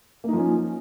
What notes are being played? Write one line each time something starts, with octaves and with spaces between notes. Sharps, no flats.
F3 A#3 C#4 D#4